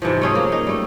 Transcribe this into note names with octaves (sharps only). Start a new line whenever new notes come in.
G#2 C3 E3 F3
A3 C#4 G#4
A#3
D#4
G3 A3